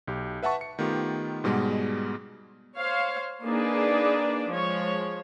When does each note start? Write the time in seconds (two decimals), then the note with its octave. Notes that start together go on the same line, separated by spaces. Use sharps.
0.07 B1 G4
0.43 B4 E5 F#5 A5 C#6
0.61 C#7
0.79 D#3 A3 B3 F4 G4
1.44 G#2 B2 G3 G#3 B3
2.77 C5 C#5 F5
3.44 A#3 D4 D#4 G#4 B4 D5
4.50 F3 G#3 C#5